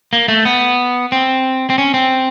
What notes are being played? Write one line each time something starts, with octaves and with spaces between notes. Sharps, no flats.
A#3
A3
B3
C4
C4
C#4
C4